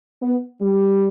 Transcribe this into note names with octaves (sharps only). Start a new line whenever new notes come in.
B3
G3